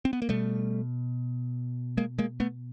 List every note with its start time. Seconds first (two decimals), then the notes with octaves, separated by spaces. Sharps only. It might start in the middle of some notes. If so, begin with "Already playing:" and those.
0.05 C4
0.13 B3
0.22 A#3
0.29 B2 G3 A3
1.97 G#3 A#3
2.19 G#3 A#3
2.40 A3 B3